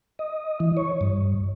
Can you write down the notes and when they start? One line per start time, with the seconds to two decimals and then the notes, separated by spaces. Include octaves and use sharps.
0.19 D#5
0.60 E3
0.77 C#5
1.01 G2